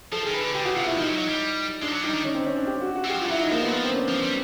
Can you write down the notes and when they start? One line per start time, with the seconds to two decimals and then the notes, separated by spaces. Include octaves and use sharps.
0.12 F3 A4
0.23 D#3 G#4
0.33 B4
0.41 D3
0.54 D3 G4
0.65 C#3 F#4
0.76 C3 F4
0.86 B2 E4
0.97 F3 D#4
1.08 F#3
1.18 F#3
1.29 G3
1.82 G#3 D4
1.88 F3
1.93 F#3
2.03 G3 D#4
2.14 D#3
2.25 C#4
2.35 C4
2.46 C#4
2.57 D4
2.67 G4
2.81 F#4
2.95 F#4
3.04 E3
3.09 F3 G4
3.20 G3 F4
3.30 F#3 E4
3.41 D#4
3.51 F3 A#3
3.63 B3
3.68 F#3
3.73 F3 A#3
3.84 C4
3.90 D4
3.95 C#4
4.08 F3
4.23 G3